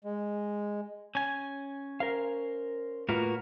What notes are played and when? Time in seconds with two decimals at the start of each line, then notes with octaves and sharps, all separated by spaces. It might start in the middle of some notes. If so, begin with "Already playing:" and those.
0.04 G#3
1.15 C#4 G#5
2.00 A#4 C5 F5
3.09 A2 A#3 F4 F#4 A#4 B4